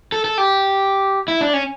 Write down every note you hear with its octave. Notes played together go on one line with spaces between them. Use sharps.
A4
A4
G4
E4
D4
C#4